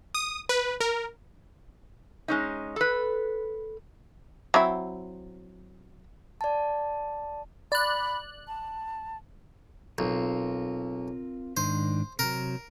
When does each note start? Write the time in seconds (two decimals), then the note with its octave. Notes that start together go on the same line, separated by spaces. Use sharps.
0.15 D#6
0.49 B4
0.81 A#4
2.28 G#3 C#4 D#4
2.76 A4 B4
4.54 F#3 C4 E4
6.41 D5 A5
7.72 D5 B5 F#6
8.48 A5
9.98 B1 C4 F4 A#4
11.57 G#2 D#3 D4 C5
12.19 C3 F#3 A#4